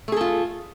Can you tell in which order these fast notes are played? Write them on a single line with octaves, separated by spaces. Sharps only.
A3 G#4 A4 F4